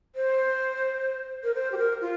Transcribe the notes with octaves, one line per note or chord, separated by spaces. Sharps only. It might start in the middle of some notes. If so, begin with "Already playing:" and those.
C5
A#4
C5
G4
A#4
F4